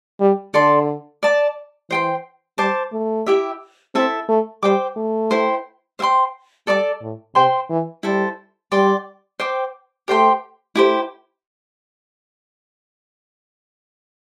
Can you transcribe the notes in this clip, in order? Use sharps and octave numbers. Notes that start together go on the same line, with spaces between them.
G3
D3 A4 D5 A5 C6
D5 A5 D6
E3 C5 G5 C6
G3 C5 A5 D6
A3
E4 G4 E5
C4 E4 A4 E5 A5
A3
G3 C5 G5 D6
A3
E4 C5 G5
C5 E5 G5 C6
G3 A4 D5 A5 D6
A2
C3 C5 G5 C6
E3
G3 E4 A4 C5 A5
G3 D5 G5 C6
C5 G5 D6
A3 G4 C5 G5 C6
A3 E4 G4 C5